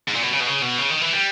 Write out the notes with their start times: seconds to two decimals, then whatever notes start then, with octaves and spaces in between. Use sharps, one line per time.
0.08 G#2
0.15 A#2
0.23 B2
0.31 C#3
0.40 B2
0.47 C#3
0.62 B2
0.78 C#3
0.90 D#3
1.01 E3
1.13 G3